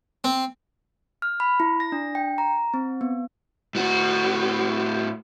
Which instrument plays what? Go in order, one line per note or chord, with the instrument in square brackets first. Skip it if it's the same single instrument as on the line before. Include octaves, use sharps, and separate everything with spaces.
[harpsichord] C4
[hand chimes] F6
B5
E4
A#6
D4
G5
A#5
C4
B3
[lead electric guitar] A2 F#4